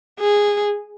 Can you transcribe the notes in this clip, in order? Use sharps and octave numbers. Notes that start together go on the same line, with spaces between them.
G#4